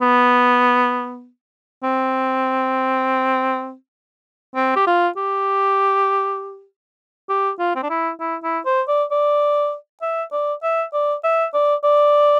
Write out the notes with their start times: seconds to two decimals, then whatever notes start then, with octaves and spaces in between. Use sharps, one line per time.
0.02 B3
1.83 C4
4.56 C4
4.76 G4
4.87 F4
5.17 G4
7.29 G4
7.59 F4
7.76 C4
7.83 D4
7.90 E4
8.20 E4
8.43 E4
8.66 C5
8.88 D5
9.11 D5
10.02 E5
10.32 D5
10.63 E5
10.93 D5
11.24 E5
11.54 D5
11.84 D5